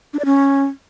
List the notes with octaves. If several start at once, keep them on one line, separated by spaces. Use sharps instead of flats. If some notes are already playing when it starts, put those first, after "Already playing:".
D4
D5
C#4